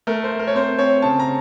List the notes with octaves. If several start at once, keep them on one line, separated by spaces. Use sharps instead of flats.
A3 A#4
C5
A3
A#4
C#5
C4 C5
C4 C#5
C#3 A5
A#5